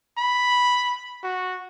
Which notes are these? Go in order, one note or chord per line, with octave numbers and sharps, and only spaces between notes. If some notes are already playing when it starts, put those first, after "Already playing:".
B5
F#4